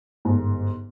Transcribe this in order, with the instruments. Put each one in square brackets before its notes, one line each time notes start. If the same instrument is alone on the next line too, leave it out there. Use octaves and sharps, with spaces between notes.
[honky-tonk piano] G1 G#2